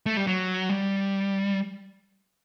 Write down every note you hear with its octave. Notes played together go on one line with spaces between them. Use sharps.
A3
G3
F#3
G3